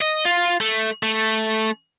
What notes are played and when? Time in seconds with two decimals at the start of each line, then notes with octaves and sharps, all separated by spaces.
0.01 D#5
0.25 F4
0.60 A3
1.03 A3